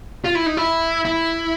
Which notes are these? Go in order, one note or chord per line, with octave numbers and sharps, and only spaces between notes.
F4
E4
D#4
E4
E4